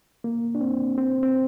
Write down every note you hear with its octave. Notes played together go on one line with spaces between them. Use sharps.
A#3
D4
C4
C4
C4